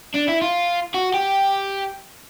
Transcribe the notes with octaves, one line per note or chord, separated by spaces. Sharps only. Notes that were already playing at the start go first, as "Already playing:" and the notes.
D4
E4
F4
F#4
G4